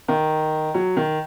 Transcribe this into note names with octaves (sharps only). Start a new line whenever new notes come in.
D#3
F#3
D#3